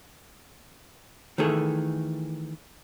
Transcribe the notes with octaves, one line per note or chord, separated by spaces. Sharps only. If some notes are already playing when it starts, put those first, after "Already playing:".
D#3 E3 A3 G#4 A4